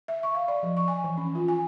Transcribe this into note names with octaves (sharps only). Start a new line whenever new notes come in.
E5
C#6
F5
D5
F3
C#6
G#5
E3
C#4
F4
G#5